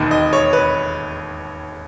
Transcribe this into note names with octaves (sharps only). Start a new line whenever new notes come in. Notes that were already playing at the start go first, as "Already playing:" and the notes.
Already playing: E1 D#2 D#3
D#5
C#5
B4